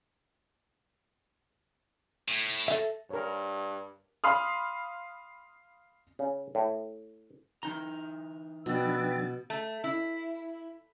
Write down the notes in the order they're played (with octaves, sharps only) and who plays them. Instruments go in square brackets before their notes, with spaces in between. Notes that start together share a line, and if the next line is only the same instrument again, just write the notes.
[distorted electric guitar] A2
[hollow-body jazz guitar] A4 E5
[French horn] G2 [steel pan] A#4 C#5
[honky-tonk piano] F5 B5 C6 D#6 F6
[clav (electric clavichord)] C#3
A2
[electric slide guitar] E3 D#4 A#5 [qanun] C6
[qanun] B2 [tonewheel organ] F3 D4 A6 [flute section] B4 G5 E6
[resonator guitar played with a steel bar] A3
E4